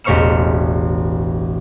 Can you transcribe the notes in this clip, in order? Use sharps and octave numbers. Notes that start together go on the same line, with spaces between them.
E1 A1 C5 C#6 F6 E7